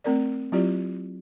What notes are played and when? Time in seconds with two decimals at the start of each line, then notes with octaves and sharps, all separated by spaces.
0.04 A3 C4 A#4 D5
0.52 F#3 C4 E4 F4 G4 D5